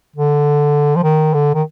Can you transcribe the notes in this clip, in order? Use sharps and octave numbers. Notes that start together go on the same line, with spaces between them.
D3
F3
D#3
D3
D#3